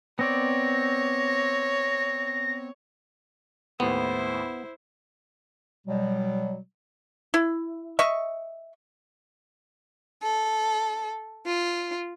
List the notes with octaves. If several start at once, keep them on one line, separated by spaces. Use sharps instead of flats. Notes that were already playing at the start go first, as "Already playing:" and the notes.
B3 C4 C#5 D5 A#6
D#2 A2 B3 E4 C5
B2 F#3 G3
E4
D#5 E5 C#6
A4
F4